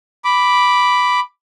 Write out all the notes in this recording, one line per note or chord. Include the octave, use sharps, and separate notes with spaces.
B5 D6